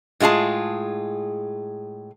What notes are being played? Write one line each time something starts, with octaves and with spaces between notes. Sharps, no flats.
A2 G#3 F4 G#4 A5